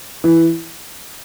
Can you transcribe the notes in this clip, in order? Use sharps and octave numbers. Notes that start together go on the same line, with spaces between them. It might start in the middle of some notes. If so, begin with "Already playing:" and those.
E3